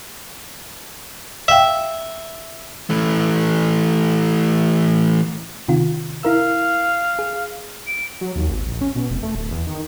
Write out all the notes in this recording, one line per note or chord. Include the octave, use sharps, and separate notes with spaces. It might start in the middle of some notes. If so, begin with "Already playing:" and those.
E5 F5 G5
E3 A3
C3 D#3 F4
E4 A#4 F5 E6
G#4
D7
F#3
D#2
G#1
A#1
C#4
B2
F1
A3
D1
E2
D#3